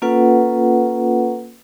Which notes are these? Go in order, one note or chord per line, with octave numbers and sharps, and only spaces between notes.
A#3 C#4 F4 A4 B4 F#5